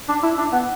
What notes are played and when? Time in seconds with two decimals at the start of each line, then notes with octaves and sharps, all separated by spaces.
0.08 D4
0.23 E4
0.37 D4
0.52 B3